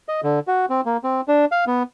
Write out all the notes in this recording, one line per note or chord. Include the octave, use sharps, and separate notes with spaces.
D#5
D3
F#4
C4
A#3
C4
D4
F5
B3